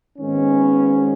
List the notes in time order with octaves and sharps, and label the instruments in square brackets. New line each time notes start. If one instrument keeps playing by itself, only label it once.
[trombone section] G#1 G#2 D#3 G#3 B3 C#4